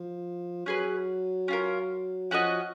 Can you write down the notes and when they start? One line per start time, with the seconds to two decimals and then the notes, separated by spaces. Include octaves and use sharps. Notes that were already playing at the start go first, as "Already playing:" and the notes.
Already playing: F3
0.66 F#3 C#4 G#4 B4
1.48 C#4 F4 A#4
2.31 F3 C#4 F#4 A#4 D#5